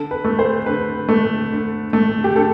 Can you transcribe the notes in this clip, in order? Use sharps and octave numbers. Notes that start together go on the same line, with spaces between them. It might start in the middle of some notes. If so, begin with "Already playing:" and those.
Already playing: D3 A4
B4
A3
C5
D3 B4
A3
D3
A3
G4
D3 A4